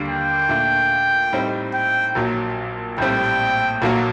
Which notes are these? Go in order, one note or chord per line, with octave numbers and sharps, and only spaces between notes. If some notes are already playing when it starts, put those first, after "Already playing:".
Already playing: D#2 D3 G3 A#3 D4
G5
A#2 A3 D4
A2 G3 C4 D#4
G5
A#1 A#2 F#3
A#1 A2 G3 C4 G5
A#1 A#2 F#3 A#3 F#4